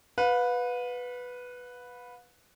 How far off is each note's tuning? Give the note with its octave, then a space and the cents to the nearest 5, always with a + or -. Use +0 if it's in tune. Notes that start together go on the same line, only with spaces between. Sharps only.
B4 +0 F5 +45